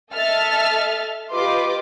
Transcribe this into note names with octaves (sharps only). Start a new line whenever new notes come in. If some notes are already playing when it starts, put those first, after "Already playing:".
A4 D#5 E5 F6 A6
F4 G4 B4 D#5 C6 D6